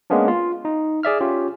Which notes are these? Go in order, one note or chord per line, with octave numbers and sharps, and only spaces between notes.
G#3 A#3 B3 C#4 D4
F4
D#4
G#4 D5 E5 F6
C#4 F4 G4